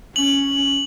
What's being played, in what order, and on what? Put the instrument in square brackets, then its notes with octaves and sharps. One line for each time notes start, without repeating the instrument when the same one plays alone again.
[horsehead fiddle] C#4 [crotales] F#7